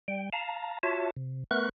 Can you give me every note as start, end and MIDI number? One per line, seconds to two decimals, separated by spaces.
0.08 0.30 55
0.08 0.30 79
0.33 0.79 77
0.33 0.79 81
0.33 0.79 82
0.83 1.10 65
0.83 1.10 66
0.83 1.10 73
0.83 1.10 76
0.83 1.10 81
1.17 1.44 48
1.51 1.69 57
1.51 1.69 59
1.51 1.69 70
1.51 1.69 71
1.51 1.69 85
1.51 1.69 90